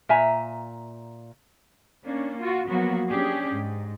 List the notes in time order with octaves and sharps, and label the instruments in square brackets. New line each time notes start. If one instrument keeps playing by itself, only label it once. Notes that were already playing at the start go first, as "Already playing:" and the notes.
[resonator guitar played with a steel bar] A#2 E5 G#5 A#5
[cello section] A#3 C#4 D4
F4 F#4
F3 F#3 A#3 B3 F#4
C#4 D4 G4 G#4
G#2